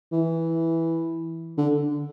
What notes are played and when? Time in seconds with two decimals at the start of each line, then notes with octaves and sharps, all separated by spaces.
0.12 E3
1.57 D3